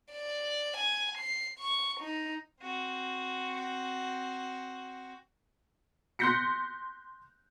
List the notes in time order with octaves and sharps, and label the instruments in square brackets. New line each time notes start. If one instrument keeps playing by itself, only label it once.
[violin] D5
G#5
C7
C#6
D#4
[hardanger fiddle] C4 F#4
[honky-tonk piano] C6 F#6 G6 A#6 B6 C#7